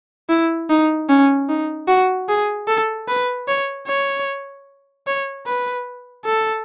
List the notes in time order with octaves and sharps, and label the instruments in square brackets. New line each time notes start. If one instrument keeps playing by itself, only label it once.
[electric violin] E4
D#4
C#4
D#4
F#4
G#4
A4
B4
C#5
C#5
C#5
B4
A4